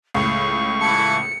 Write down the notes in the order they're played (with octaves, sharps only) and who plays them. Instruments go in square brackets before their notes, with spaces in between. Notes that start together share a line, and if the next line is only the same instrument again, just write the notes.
[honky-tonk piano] C#2 A2 [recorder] C#6
[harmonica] E3 E4 A5 [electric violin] C#7